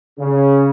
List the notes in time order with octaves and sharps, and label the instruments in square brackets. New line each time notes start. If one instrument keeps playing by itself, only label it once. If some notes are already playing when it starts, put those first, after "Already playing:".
[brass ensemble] C#3